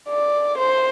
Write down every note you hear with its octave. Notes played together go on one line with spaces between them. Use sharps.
D5
C5